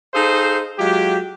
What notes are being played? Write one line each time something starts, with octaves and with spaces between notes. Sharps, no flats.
D#4 G#4 A4 C5 F5
F#3 G#3 F4 G4